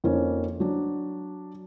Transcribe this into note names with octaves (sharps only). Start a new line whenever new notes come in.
F2 A#3 C#4 D#4
F#3 D4